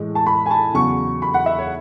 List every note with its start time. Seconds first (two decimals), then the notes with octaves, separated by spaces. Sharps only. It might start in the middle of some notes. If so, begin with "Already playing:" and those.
Already playing: A2 E3 G#3
0.15 A5
0.26 B5
0.46 G#5
0.51 A5
0.74 E2 C#3 F#3 C#6
1.22 B5
1.34 F#5
1.46 E5
1.58 C#5